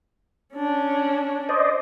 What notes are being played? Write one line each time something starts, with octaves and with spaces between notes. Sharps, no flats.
C#4 D4
C5 D5 D#5